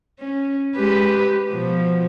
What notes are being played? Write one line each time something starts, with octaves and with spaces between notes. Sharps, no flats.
C#4
G#3 G4 B4
B2 F3